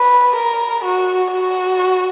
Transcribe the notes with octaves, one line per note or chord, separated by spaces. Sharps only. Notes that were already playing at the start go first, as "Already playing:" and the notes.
Already playing: B4
A#4
F#4
F#4